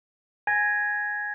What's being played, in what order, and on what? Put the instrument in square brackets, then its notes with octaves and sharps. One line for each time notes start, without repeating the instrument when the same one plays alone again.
[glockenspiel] G#5 G#6 A#6